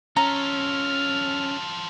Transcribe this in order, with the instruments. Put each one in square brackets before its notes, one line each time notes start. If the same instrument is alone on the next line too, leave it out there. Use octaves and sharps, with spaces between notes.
[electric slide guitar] C#4 [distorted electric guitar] F4 A4 [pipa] A#5 [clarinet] F6